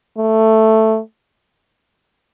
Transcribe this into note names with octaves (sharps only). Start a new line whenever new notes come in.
A3